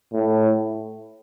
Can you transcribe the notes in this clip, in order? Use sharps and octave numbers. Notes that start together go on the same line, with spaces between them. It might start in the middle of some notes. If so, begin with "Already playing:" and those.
A2